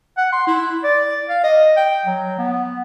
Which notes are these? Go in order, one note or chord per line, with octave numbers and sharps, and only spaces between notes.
F#5
C6
E4
D5
F5
D#5
G5
F#3
B3